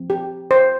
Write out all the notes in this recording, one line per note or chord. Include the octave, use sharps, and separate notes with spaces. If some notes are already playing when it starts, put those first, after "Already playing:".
Already playing: F3 C4
G4
C5